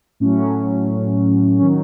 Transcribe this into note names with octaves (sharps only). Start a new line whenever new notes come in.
A2 F#3 C#4
D#3 F#3 C#4